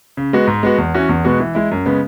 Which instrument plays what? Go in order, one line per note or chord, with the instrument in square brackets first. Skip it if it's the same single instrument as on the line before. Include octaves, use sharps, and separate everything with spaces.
[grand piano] C#3
G#3 B3 F#4
G#2
G#3 B3 F#4
E2
E3 C#4 F#4
E2
B2 G#3 B3 F#4
E3
G#3 E4
F#2
C#3 G#3 B3